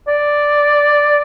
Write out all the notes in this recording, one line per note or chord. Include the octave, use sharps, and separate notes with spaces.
D5